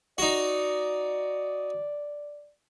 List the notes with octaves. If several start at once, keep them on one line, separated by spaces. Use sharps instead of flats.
D#4 F#4 D5